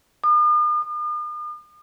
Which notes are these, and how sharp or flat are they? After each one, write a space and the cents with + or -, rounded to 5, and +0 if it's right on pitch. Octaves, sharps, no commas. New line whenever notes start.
D#6 -45
D#6 -45